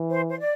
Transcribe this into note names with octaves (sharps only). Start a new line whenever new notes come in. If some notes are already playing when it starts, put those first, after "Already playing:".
Already playing: E3
C5
C5
D5